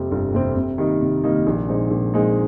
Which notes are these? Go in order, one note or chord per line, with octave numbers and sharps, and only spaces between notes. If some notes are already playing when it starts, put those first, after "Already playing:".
Already playing: F2 C3 G3 C4
G1
F2 C3 G3 C4
C3
D#3 G3 A#3 D#4
C3
D#3 G3 A#3 D#4
A#1
A#2 G#3 C4 D#4
A#1
A#2 G#3 C4 D#4